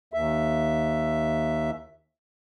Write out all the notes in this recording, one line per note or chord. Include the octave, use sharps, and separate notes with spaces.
D#2 E5